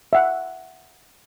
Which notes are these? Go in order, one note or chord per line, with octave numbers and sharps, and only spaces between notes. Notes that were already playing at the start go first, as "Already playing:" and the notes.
E5 F#5